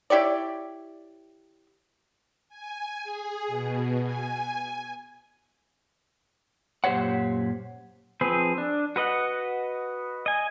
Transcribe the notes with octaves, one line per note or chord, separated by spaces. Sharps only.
E4 G4 C#5 D5
G#5
G#4
B2
G#5
F#2 A#2 G4 C5 C#5 F#5
F3 C4 G#4 B4
D4
F#4 B4 D#5 F#5
D#5 G#5